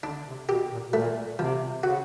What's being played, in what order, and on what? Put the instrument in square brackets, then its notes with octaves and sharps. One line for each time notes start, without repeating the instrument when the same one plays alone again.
[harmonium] D3 [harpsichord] D4
[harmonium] C3
[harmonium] B2 [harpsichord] G4
[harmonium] A#2
B2
[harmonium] A#2 [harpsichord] A3
[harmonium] C3 [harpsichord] F3
[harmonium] C#3 [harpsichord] F#4